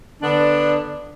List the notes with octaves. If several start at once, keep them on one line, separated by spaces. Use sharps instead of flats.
D3 B3 D4